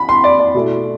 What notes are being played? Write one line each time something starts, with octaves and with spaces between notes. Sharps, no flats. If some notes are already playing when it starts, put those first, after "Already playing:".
Already playing: B5
C6
D5
D5
B2 A3 E4